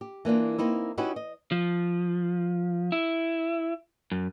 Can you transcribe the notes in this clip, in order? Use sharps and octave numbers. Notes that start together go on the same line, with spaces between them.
G4
E3 A#3 D4 F4
A#3 C4 D#4 E4
C#4 D#4 E4 F#4 G4 B4
D#5
F3
E4
F#2